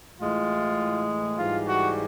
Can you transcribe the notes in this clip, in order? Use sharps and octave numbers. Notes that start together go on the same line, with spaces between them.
A2 E3 G#3 F4
G#2 E3 G3 F4
F#4